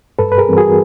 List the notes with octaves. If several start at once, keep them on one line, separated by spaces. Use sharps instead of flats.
G2 A4 B4
B4
G#4 A#4
E3 G3 C4
F#4 G#4